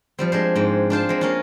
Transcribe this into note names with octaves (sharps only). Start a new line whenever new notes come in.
F3 G3 C4
G#3 D4 C5
G#2 C4
D4 F4 C5 A5
G#3 C4
A#3 C#4 F4